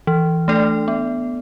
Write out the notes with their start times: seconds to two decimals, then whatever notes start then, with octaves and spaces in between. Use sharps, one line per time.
0.07 E3
0.48 A3 D4 A4 D5
0.88 B3